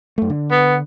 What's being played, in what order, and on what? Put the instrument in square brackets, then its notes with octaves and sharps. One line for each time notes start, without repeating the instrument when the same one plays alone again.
[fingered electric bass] F#2 A3
D3
[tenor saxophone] B3